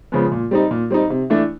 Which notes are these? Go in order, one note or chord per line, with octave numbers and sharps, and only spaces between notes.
C#3 F3 G#3 B3
A#2
G3 C4 D#4
A#2
G3 C4 D#4
C3
E3 A3 D4